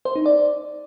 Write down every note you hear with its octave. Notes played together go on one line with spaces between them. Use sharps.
C5
D#4
D5